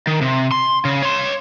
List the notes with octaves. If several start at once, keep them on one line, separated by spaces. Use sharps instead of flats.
D#3
C3
C6
C#3
C#5 C6